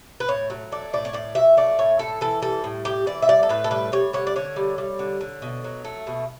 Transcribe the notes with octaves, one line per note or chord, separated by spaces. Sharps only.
B4
A2 C#5
F#3
A3 D5
A2 D5
C#5
A2 D5
F#3 E5
A3 D5
A2 C#5
A2 A4
E3 A4
G3 A4
A2
A2 G4
E3 D5
E5
G3 D5
A4
A2 B4
A4
G3 B4
G3 C#5
D3 C#5
D5
D3 C#5
G3
G3
D3
D3
B2
F#3
A3
B2